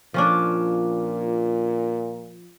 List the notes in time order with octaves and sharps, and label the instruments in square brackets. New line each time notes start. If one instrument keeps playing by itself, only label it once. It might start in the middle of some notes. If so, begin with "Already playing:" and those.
[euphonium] A#2 [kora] F3 C#4 D4